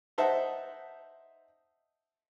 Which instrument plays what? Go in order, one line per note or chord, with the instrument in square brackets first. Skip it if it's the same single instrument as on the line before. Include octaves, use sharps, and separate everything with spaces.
[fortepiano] D#4 C5 E5 F#5 A5